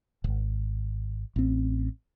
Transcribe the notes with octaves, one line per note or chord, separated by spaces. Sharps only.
D#1 G#1
A1 C4